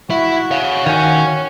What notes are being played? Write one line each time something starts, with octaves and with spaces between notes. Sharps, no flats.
E4 F#4
C#5 F5
D#3 C#5 G#5